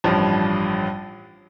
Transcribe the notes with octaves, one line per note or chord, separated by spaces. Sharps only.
A1 G2 F3